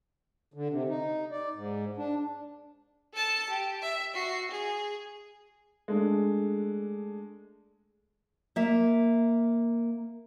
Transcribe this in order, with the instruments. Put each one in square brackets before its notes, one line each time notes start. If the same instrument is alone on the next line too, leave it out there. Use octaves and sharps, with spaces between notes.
[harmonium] D3
C3
D#4
D5
G#2
D4
[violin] A4 A5
G4
E5
F#4 C7
G#4
[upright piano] G#3 A3 D4
[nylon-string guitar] A#3 E5